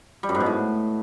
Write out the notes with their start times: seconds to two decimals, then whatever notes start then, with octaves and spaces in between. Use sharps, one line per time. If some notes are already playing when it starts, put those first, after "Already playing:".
0.23 G3
0.29 F#2
0.35 G#2
0.40 B2
0.46 A2